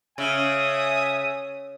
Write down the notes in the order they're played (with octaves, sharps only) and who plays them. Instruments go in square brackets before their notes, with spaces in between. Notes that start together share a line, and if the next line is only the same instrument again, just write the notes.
[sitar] C#3 [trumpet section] E5 G#5 D#6